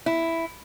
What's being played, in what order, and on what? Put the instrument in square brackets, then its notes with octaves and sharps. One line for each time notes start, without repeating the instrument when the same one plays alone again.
[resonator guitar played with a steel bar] E4